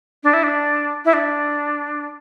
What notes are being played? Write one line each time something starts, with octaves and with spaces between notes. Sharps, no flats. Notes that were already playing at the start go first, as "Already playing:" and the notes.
D4
E4
D4
E4
D4